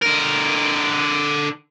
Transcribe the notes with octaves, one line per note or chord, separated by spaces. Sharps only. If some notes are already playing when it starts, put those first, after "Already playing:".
D3 A#4